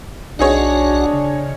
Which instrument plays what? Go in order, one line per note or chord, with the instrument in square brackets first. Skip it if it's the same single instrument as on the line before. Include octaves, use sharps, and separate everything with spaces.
[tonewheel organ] B1 F#4 F#5 [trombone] D4 [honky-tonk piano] D#4 G#4 C#5
[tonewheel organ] C#3